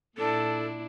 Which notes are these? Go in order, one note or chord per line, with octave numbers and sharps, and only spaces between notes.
A#2 D4 E4 A4